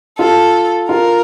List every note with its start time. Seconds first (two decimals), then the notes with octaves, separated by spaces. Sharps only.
0.19 F4 A4
0.89 F4 A#4